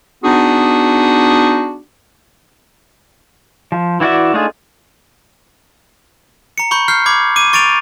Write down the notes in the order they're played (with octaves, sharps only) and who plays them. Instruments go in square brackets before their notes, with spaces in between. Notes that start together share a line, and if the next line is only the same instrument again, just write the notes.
[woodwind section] B3 D4 D#4 F#4 G#4
[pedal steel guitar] F3
E3 E4 F#4 D5 E5
A3 D4 D#4 F4 G#4
[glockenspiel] A#5 C#7
B5 C#6 G6 C#7
B5 F6 G6 C7
B5 D6 G#6
D6 D#7
C#6 A6 D7 D#7 F7